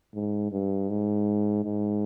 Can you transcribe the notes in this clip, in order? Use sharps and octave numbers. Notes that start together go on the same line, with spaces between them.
G#2
G2
G#2
G#2